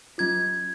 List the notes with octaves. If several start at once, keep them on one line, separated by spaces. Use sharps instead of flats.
F#3 C#4 F4 G#6